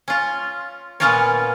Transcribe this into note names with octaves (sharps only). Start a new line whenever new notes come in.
C#4 F4
A#2 B3 C#4 F4 A#4 C#5